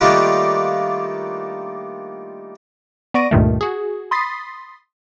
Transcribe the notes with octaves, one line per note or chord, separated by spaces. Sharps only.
D#3 G3 A3 A#3 D4 F4
B3 D5 C#6 A#6 D7 D#7
C#2 G2 A#2 D#3 A3
F#4 G#4
B5 C6 D#6 A6 B6 C7